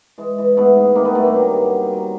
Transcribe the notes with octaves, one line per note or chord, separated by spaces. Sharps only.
E3 G#3
E3
G#2 A3 B3
G#2
D#3 A#3 C4
A3 B3
G2 A3
A#3 C4
F#3
G2
F#3
F#3